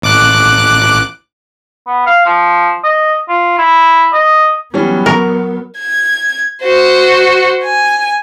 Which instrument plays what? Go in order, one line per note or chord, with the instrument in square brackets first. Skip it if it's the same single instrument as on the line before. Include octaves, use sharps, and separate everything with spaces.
[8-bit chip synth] A1 D6 F#6
[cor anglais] B3
F5
F3
D#5
F4
E4
D#5
[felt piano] E3 G3 C#4 [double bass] F#3 B3
[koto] A#4 [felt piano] C#6
[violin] G#6
F#4 C5
G#5